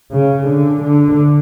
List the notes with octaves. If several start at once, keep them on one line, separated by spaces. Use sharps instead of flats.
C#3
D3
D3